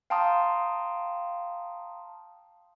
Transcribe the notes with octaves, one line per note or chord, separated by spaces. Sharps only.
F5 G5 A5 A#5 C6 D#6